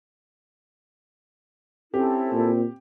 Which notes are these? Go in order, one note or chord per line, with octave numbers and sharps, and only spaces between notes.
C4 C#4 E4 G4 A4
A#2